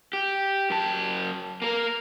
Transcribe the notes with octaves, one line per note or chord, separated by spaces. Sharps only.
G4
F#2 A5
A#3 A#4